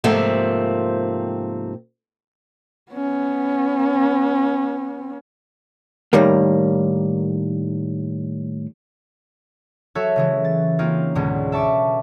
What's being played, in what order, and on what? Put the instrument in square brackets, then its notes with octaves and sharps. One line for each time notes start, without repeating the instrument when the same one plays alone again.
[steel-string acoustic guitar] G#2 C3 F3 A3 A#3 C4
[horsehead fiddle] B3 C#4
[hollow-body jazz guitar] A2 D#3 G3 A#3
[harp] F#3 F#4 A4 C#5 E5
C#3 E3 G#3
A6
A#3 C4 C#4 D#4 F4
C#2 G#2 B2 D3 G#3 B3
E5 A5 C#6 D6